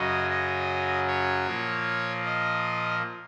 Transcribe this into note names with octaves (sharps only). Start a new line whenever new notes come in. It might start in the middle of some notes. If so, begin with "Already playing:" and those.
Already playing: F#2 C#3 F#3 D#5
D#5
C#5
A#2 F3 A#3
D#5